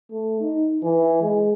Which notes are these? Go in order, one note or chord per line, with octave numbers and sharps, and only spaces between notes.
A3
D#4
E3
G#3